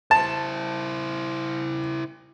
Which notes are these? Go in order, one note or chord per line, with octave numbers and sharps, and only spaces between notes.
E4 C5 A5